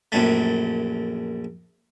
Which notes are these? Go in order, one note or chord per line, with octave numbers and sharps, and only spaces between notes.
A#1 F#2 A3